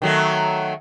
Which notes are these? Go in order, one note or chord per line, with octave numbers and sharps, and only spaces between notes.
D#3 F#3 A3